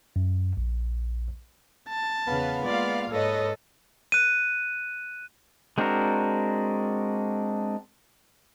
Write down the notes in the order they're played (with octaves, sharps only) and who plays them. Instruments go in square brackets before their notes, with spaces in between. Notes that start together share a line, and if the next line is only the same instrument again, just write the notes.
[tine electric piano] F#2
A#1
[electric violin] A5
[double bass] E2 C#3 [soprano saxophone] B3 [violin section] B4 F5
[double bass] G#3 A#3 [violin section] F4 F5 [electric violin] D5
[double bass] G#2 [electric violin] A4 [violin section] B4 C#5 D#5
[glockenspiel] F#6 D#7
[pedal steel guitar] G#3 C4 D4 F#4 A#4